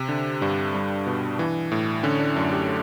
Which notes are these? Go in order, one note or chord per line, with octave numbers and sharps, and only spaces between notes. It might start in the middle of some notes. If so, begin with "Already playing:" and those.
Already playing: C3
D3
G2 D4
G3
B2
E3
A2
D3 C#4
D4
F#2 D4
G4